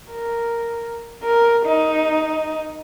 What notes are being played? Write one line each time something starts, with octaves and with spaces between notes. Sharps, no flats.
A#4
A#4
D#4